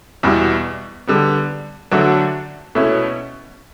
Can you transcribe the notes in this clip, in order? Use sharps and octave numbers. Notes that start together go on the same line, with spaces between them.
E2 B2 G3 B3 E4
D3 G3 B3
D3 F#3 A3 D4 F#4
B2 A3 C#4 E4